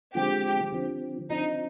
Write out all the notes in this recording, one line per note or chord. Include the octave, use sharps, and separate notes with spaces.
D3 F3 G#3 C4 G4
D3 F3 C4
D3 F3 C4 D#4